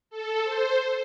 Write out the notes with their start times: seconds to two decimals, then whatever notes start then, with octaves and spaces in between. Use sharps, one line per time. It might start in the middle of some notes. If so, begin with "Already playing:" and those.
0.10 A4
0.44 C5